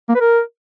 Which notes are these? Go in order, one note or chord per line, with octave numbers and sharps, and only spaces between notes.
A#3
B4
A#4